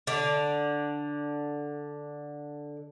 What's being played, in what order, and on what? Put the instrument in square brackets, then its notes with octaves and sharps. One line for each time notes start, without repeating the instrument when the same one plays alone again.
[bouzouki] D3 D5